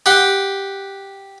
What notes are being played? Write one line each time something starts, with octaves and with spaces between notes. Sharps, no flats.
G4 F#5 C6